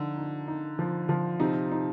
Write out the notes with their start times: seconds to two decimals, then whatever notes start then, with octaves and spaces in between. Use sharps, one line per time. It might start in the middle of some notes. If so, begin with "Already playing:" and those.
Already playing: D3 F3 D#4
0.17 D#4
0.48 D#4
0.79 F3
1.09 F3
1.40 C3 D#4
1.72 D#4